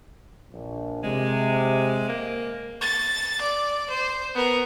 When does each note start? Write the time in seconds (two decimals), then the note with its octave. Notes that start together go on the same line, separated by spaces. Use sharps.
0.52 A#1
1.03 C3 G#3
2.09 A#3
2.81 A6
3.41 D5
3.90 C5
4.35 B3 A#4